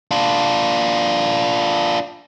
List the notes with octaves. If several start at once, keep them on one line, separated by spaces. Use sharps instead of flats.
D4 F4